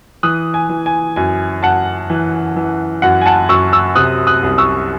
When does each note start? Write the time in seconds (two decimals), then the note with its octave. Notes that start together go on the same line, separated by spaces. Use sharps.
0.23 E3 D#6 F#6
0.54 G#5
0.69 E3
0.86 G#5
1.16 F#2 G#5
1.63 F#2 F#5 A5
2.10 E3
2.56 E3
3.02 F#2 F#5
3.21 G#5
3.26 F#5 A5
3.49 F#2 C#6 E6
3.73 C#6 E6
3.95 C3 D#6 F#6
4.27 D#6 F#6
4.43 C2
4.58 C#6 E6